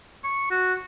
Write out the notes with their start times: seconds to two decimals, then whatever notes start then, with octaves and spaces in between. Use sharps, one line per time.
0.24 C#6
0.51 F#4